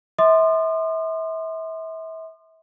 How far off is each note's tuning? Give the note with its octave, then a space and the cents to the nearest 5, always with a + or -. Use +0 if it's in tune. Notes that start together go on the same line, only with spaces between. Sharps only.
E5 -35 C6 +0 D#6 -45